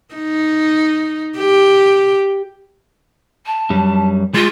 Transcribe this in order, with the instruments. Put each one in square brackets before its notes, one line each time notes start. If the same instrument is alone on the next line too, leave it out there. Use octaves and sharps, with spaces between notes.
[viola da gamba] D#4
G4
[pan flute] A5
[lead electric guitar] F#2 G3
[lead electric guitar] G#3 [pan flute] F4